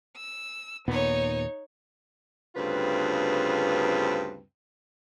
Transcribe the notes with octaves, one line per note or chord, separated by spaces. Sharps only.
E6
D#2 A#2 B3 D#4 C#5
D2 G2 C#3 C4 F4 B4